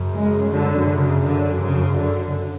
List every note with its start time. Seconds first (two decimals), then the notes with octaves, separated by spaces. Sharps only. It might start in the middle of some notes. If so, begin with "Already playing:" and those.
Already playing: F#2 C#3
0.16 G#3
0.52 D3
0.89 C#3
1.25 D3
1.62 C#3
1.97 D3